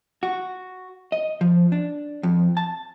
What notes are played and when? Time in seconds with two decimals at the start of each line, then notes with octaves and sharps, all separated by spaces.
0.23 F#4
1.12 D#5
1.41 F3
1.72 D4
2.23 F2
2.57 A5